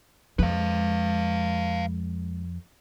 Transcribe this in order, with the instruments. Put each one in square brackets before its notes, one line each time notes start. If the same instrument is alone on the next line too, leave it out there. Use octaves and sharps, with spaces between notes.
[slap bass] F2 F3 [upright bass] G#3 [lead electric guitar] B4 F5